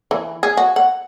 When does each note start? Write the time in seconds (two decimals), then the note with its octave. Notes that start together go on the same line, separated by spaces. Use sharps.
0.11 E3
0.43 G#4
0.57 F#4
0.76 F#5